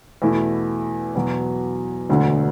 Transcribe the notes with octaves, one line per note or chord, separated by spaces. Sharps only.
E2 B2 A3 E4
E2 B2 F#3
E1 D2 D3 A3